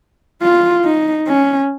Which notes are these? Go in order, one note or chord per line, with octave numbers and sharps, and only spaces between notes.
F4
D#4
C#4